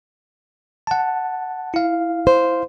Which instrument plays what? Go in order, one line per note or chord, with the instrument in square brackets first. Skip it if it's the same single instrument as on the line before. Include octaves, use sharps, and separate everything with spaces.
[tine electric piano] F#5 A5
E4 F5
[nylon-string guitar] C5